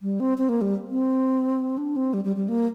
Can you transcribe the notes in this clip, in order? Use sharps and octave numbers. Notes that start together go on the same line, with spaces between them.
G3
C4
C4
A#3
G3
C4
D4
C4
G3
G3
G3
A#3